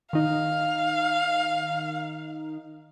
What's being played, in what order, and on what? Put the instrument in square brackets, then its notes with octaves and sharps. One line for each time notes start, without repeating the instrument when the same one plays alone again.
[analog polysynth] D#3 D#4 [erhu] F5